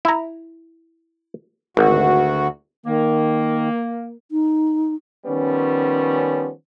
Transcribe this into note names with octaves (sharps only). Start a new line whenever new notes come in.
E4 A#5
G#1 D2 F#4
D#3 A#3
D#4
D#3 F3 G3 B3 C#4